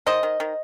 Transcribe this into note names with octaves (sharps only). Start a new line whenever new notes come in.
D#3 C5 D#5
D#3
D#3